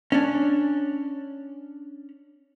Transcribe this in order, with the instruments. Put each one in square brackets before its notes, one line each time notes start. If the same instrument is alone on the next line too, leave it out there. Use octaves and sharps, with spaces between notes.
[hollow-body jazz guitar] C#4 D4